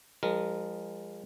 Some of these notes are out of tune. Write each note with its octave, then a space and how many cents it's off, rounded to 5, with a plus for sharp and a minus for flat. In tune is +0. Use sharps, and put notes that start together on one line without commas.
F3 +0 G#3 -35 A#4 +0